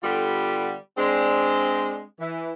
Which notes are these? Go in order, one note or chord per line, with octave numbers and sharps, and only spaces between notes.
D3 G3 B3 F4 G4 A4
G#3 C4 D4
E3